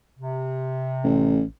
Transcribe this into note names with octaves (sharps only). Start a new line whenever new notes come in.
C3
A1